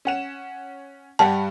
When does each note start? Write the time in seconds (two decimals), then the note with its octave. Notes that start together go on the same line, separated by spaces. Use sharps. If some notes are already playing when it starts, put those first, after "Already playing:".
0.05 C#4 F#5 E7
1.19 G2 G3 F#5 A5